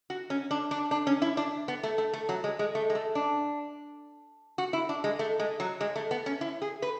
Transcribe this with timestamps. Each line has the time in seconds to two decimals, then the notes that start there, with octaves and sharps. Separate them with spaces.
0.10 F#4
0.30 C#4
0.51 D4
0.71 D4
0.91 D4
1.07 C#4
1.22 E4
1.37 D4
1.68 B3
1.83 A3
1.98 A3
2.14 A3
2.29 F#3
2.44 G#3
2.59 G#3
2.75 A3
2.90 G#3
2.95 A3
3.15 D4
4.58 F#4
4.73 E4
4.89 D4
5.04 G#3
5.19 A3
5.40 G#3
5.60 F#3
5.81 G#3
5.96 A3
6.11 B3
6.26 C#4
6.41 E4
6.62 G#4
6.82 B4